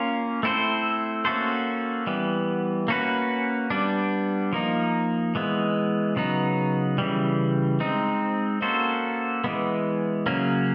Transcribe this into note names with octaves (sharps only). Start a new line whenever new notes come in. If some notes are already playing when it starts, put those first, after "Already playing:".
Already playing: A#3 C#4 F4
A3 C4 E4 A4 C5
A#3 C#4 F#4 A4 C5
E3 G3 B3
A#3 C#4 F#4 B4
G3 B3 D4
F3 A#3 D#4
E3 G#3 B3
C#3 F#3 B3 D#4
C#3 E3 G3
G#3 C4 D#4
A#3 C#4 F#4 A4 C5
E3 G#3 B3
C#3 F#3 A#3 C#4